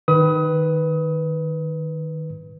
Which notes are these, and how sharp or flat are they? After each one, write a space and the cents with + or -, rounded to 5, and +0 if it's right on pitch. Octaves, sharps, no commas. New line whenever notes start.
D#3 -5 B4 +0 D#6 +30